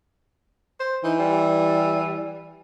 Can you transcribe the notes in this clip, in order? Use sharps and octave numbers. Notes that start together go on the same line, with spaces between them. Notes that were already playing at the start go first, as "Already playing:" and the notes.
C5
E3 D#4
G3